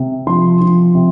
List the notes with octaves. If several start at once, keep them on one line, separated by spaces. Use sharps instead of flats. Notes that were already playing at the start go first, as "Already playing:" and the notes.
Already playing: C3
F3 C6
F3
C3